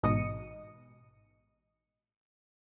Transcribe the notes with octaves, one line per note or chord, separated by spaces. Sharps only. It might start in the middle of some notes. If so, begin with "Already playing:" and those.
A1 G#2 B2 D#5 C#7 D#7